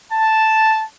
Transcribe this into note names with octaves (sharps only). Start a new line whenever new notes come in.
A5